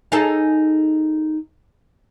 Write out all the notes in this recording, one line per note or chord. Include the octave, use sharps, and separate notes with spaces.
D#4 G#4 A4